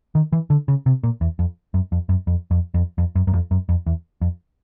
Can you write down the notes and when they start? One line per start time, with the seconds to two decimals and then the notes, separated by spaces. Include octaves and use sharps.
0.15 D#3
0.32 E3
0.50 D3
0.68 C#3
0.86 C3
1.03 A#2
1.21 E2
1.39 F2
1.74 F#2
1.92 F2
2.09 F#2
2.27 F2
2.51 F2
2.74 F2
2.98 F2
3.15 F#2
3.27 F#2
3.33 F2
3.51 F#2
3.69 F2
3.86 E2
4.21 F2